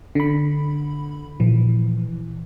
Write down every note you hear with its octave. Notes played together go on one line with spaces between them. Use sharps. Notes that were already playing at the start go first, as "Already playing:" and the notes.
D3 B5
A#2 E3 F3